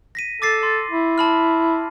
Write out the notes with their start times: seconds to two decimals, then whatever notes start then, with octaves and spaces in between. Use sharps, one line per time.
0.15 A#6 B6 D#7
0.42 A4 D6 A6 C7
0.63 C6
0.91 E4
1.18 A5 B5 F6